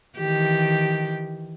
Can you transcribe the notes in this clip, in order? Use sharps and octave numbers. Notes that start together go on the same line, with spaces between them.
D#3 E3 G4